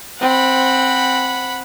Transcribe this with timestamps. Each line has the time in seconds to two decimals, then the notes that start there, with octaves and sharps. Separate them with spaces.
0.21 C4 F#5 B5